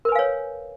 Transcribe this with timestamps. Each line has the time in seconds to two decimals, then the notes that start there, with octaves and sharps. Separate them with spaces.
0.05 A#4
0.09 B4
0.12 G#5
0.15 F5
0.19 C#5